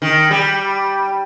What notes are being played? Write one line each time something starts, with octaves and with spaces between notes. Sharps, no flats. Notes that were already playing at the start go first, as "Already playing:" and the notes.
D#3
G3